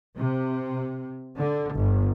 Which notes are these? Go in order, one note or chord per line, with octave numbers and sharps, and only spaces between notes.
C3
D3
G1